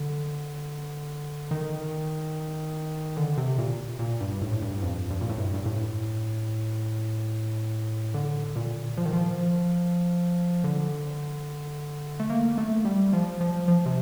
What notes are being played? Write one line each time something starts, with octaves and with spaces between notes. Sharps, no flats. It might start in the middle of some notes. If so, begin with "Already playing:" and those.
Already playing: D3
D#3
D3
C3
A#2
A#2
G2
A2
G2
F2
G2
A#2
A2
G2
G2
A2
D3
A#2
F3
D#3
F3
D3
A3
A#3
A3
G3
F3
F3
F3
C3